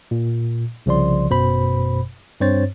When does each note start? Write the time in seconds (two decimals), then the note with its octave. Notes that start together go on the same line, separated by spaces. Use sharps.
0.11 A#2
0.86 C2 C#3 F3 D5 C6
1.29 G1 F#2 B2 C5 B5
2.40 G2 C4 C5 C#5 A6